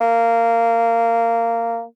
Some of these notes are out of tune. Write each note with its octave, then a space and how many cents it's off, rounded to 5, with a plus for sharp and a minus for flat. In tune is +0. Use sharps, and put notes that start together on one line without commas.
A#3 -15